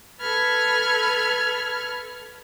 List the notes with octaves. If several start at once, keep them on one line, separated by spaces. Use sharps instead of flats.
A4 B4 B5 F6 G#6